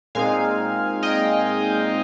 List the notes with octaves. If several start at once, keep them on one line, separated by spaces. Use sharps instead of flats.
A#2 G#3 C4 D#4 F5 G#5
D#5 G5